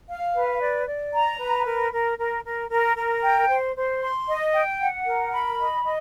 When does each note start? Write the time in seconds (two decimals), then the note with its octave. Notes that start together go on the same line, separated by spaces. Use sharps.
0.09 F5
0.35 B4
0.61 D5
0.87 D5
1.13 A#5
1.39 B4
1.66 A#4
1.92 A#4
2.18 A#4
2.44 A#4
2.71 A#4
2.96 A#4
3.22 G5
3.49 C5
3.76 C5
4.02 C6
4.28 D#5
4.53 G5
4.80 F#5
5.06 A#4
5.32 B5
5.58 D#5
5.85 D#5